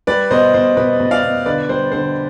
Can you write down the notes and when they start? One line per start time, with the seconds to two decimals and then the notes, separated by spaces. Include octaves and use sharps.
0.07 G3 B4 D5
0.31 B2 C5 D#5
0.54 B2 C5
0.77 B2 B4
1.00 B2
1.11 D5 F5
1.23 B2
1.46 D3 B4 D5
1.69 G3 C5
1.92 D3 C5